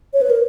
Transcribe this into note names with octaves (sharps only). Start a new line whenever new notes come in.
C#5
B4
A#4